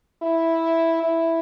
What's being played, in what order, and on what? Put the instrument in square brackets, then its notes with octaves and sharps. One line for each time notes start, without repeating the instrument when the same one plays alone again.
[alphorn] E4
E4